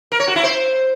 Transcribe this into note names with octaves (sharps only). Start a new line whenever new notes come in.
A#4
C#5
F#4
E4
C5